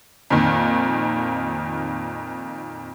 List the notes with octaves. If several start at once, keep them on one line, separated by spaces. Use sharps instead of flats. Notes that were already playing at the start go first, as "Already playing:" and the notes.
F2 A#2 D#3